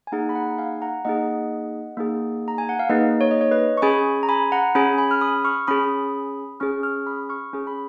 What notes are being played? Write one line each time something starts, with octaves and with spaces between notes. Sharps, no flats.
G#5
A#3 D#4 G#4 F#5 A#5
B5
F#5 A#5
F5 G#5
F#5 A#5
A#3 D#4 G#4 D#5 F#5
A#3 D#4 G#4
A#5
G#5
F#5
F5
A#3 D#4 G#4 B4 D#5
C#5
D#5
C#5
B4 D#5
C#6
C#4 G#4 G#5 B5
A#5
G#5 B5
F#5 A#5
C#4 G#4 G#5 B5
G#5 B5
F6
B5 D#6
C#6 F6
C#4 G#4 B5 D#6
C#4 G#4 C#6 F6
C#6 F6
B5 D#6
C#6 F6
C#4 G#4
B5